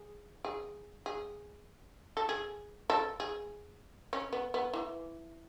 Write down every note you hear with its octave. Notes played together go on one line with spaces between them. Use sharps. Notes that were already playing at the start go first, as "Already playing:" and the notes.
Already playing: G#4
G#4
G#4
A4
G#4
A4
G#4
C#4
B3
B3
E3